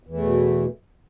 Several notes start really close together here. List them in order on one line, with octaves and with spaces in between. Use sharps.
E2 E3 A3 B2